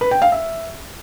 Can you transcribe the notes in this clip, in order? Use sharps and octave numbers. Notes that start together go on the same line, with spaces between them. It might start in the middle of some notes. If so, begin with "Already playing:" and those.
B4
G5
F5
E5